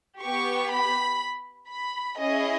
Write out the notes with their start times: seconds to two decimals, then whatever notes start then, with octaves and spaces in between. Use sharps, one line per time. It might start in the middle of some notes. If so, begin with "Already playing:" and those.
0.21 B3 G4 C#6
0.71 B5
1.70 B5
2.18 C#4 E4 G#4 D#5